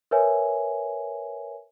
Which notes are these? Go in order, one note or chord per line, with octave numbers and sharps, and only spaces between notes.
A#4 B4 C#5 E5 G#5